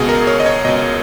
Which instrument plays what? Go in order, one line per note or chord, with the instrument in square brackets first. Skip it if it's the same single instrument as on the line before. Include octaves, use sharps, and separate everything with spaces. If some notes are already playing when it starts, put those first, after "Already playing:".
Already playing: [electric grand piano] C#2 B2 G#4
A#4
C#5
D#5
C#5
C#2 B2 D#5